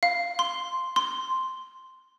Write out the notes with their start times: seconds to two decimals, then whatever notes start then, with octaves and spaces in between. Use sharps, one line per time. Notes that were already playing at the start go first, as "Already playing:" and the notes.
0.03 F5
0.39 C6
0.96 C6